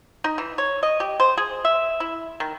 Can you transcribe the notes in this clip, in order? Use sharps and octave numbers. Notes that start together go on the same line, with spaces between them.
D#4
E3
C#5
D#5
G4
C5
G#4
E5
E4
D#3